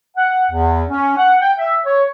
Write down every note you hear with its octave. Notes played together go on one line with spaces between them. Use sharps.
F#5
E2
C#4
F#5
G5
E5
C#5